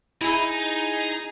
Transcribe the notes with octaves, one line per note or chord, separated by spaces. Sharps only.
D#4 E4 G#4